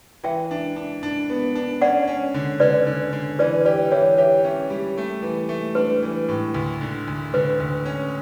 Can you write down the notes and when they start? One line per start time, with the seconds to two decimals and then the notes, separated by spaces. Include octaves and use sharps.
0.24 E3 E5 G5
0.51 D4
0.76 D4
1.03 D4
1.30 B3
1.55 D4
1.81 C#4 D5 F#5
2.07 C#4
2.34 D3
2.60 D3 B4 D5
2.86 D3
3.12 D3
3.39 E3 B4 D5
3.65 G4 B4 D5
3.92 E3 C#5 E5
4.18 G4 C#5 E5
4.44 C#4
4.70 G3
4.98 A3
5.23 E3
5.49 A3
5.75 D4 B4
6.03 E3
6.29 A2
6.54 D2
6.81 D3
7.08 D2
7.34 D3 B4
7.60 D2
7.85 C#4